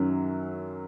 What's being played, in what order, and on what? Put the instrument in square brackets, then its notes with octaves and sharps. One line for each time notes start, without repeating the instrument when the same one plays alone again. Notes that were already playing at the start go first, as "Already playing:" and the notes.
Already playing: [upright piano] F#2 D#3 F#3 C#4